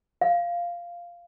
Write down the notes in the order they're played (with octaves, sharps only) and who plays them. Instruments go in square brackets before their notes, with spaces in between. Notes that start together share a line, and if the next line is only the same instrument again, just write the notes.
[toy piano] F5